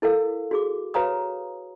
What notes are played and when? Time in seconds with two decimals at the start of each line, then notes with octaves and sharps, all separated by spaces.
0.02 E4 A4 A#4 F5
0.51 F#4 G#4 D6
0.94 F#4 B4 C#5 F5 A#5 D#6